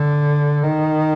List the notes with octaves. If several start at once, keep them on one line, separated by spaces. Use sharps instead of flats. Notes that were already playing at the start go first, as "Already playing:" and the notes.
Already playing: D3
D#3